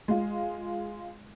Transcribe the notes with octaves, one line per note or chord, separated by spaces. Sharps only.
G#3 F4